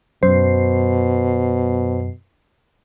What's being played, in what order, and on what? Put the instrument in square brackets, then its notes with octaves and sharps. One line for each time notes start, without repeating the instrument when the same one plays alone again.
[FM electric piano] F#2 C7 [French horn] B2 [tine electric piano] C5